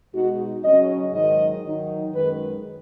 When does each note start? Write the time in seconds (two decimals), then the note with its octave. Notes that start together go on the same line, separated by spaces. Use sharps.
0.14 B2 G#3 D#4 F#4
0.64 C#3 F#3 C#4 D#5
1.13 G#2 D#3 F#3 D#4 D#5
1.64 D#3 F#3 D#4
2.13 F#2 D#3 G#3 B4